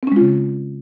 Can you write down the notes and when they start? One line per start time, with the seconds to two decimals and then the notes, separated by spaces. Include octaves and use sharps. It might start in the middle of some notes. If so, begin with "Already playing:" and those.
0.03 C4
0.07 C#4
0.12 G#3
0.16 F4
0.21 C#3